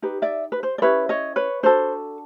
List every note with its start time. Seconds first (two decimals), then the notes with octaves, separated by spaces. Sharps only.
0.02 D#4 G4 B4
0.22 D5 E5
0.52 B4
0.63 C5
0.78 D5
0.82 C#4 E4 G4 B4 C#5
1.09 C#5 D#5
1.36 B4 C#5
1.63 D4 F#4 A4 C5